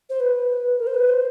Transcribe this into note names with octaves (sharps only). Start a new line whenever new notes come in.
C5
B4
A#4
C5
B4
C5